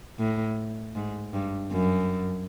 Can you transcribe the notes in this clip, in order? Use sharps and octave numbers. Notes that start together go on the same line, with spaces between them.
A2
G#2
G2
F#2